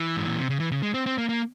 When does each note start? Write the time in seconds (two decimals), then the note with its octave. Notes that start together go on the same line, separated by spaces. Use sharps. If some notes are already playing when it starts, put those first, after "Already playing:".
Already playing: E3
0.16 G#2
0.27 A#2
0.39 C3
0.50 C#3
0.60 E3
0.72 C#3
0.82 G#3
0.94 C4
1.06 C4
1.18 A#3
1.29 A#3